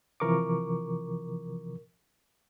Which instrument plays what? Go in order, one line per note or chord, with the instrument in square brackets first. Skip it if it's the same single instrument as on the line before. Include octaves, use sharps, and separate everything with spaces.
[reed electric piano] C3 E3 F3 A#4 C#6 D6